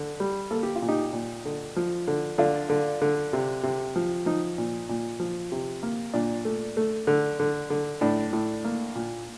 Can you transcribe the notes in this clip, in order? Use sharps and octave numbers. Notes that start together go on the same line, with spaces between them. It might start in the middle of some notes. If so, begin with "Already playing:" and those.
Already playing: D3
G3
A#3 A4
G4
F4
A#2
D#4 G4
A#2
D3
F3
D3
D3 D4 F4
D3
D3
C3
C3
F3
F3 D#4
A#2
A#2
F3
C3
A#3
A#2 D4
A3
A3
D3
D3
D3
A2 D4
A2
A#3
A#2